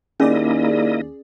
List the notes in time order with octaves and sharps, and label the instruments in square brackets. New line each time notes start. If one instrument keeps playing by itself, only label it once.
[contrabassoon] D#2 [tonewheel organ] A#3 E4 D#5 [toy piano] C#4 [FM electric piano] G#4 D5